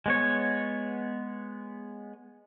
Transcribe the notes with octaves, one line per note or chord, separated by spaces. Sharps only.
G#3 B3 C#5